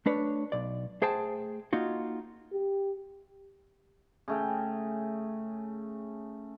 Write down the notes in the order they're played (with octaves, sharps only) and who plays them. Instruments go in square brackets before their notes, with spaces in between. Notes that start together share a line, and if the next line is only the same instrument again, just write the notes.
[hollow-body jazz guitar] A3 D4 B4 C#5
B1 D5
A3 G#4 C5 G5 A5
A#3 D#4 F4 F#4
[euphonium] G4
[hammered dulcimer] C#3 A3 G5